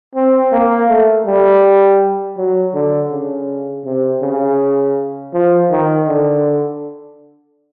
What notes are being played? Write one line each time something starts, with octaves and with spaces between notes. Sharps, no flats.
C4
A#3
A3
G3
F#3
D3
C#3
C3
C#3
F3
D#3
D3